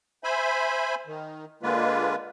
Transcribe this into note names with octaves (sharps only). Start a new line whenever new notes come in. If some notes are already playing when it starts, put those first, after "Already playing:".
C5 E5 G#5 B5
D#3
D3 G#3 A#3 F4 B4